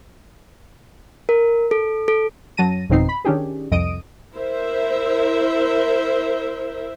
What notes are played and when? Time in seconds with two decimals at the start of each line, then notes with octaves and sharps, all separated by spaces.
1.29 A#4
1.71 A4
2.08 A4
2.57 F#2 F#3 A5 A#6 D#7
2.89 G1 F2 B2 C4 D#4 C7
3.09 B5
3.25 D#3 C#4 D4 G4 G#4
3.71 C2 F2 D#5 D#6 D7 D#7
4.34 E4 A#4 C5 E5